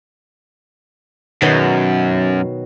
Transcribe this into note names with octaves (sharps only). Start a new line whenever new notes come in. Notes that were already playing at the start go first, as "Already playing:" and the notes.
F#2 B2 D#3 F#3